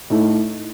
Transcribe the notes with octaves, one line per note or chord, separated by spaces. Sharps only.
A2 A3 D#4